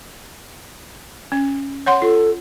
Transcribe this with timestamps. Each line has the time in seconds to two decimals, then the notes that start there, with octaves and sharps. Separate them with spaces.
1.32 C#4
1.86 C#5 F#5 C6
2.02 F4 A4